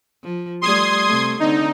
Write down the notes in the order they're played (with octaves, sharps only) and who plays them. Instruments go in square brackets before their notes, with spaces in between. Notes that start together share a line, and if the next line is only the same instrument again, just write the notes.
[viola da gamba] F3
[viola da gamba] G3 A3 [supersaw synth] C6 D#6 G#6
[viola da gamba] C3 A3
[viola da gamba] D3 C4 [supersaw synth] D#4